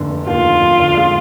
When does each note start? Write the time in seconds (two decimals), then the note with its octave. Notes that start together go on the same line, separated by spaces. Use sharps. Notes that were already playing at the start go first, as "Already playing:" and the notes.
Already playing: F1 D3 A#3
0.10 F1
0.27 D#2 F4
0.44 D3
0.61 F1
0.80 D3
0.97 G#3